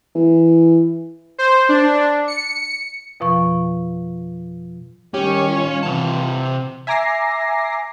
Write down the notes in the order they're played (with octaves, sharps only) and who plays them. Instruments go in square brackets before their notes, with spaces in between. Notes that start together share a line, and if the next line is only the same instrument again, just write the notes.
[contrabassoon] E3
[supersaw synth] C5
D4
C#7
[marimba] F2 B2 F3 C#6
[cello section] D#3 G3 C#5 [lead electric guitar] C#4 [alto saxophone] G4
[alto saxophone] F4
[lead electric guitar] C3 A5 [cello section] E3
[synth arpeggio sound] E5 G#5 A#5 D6 A#6 C7